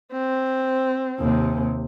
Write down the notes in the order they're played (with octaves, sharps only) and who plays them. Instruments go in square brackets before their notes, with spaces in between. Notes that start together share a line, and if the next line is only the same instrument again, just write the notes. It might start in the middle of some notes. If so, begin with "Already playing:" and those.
[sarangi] C4
[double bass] D#2 C3